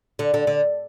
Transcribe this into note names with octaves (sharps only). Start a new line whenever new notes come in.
D3
D3
D3